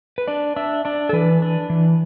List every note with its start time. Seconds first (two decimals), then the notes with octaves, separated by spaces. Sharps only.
0.18 B4
0.28 D4 D5
0.56 D4 E5
0.85 D4 D5
1.09 A4
1.13 E3 B4
1.42 D4
1.70 E3